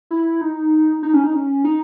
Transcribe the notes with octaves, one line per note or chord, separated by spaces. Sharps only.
E4
D#4
D#4
C#4
D#4
C#4
D#4